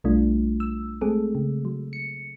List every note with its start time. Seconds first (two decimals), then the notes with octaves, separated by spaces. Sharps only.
0.04 B1 G3 A3 D4 F4
0.60 E6
1.01 G#3 A3 C4 G#4 A4
1.35 C#3
1.65 F#3
1.93 C#7